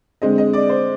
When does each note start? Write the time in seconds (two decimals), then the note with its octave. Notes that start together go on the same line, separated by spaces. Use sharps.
0.22 D3 G#3 C4 D#5
0.38 D#5
0.53 D5
0.69 C5